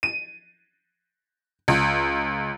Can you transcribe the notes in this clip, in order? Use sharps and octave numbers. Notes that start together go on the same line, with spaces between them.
D#7
C#2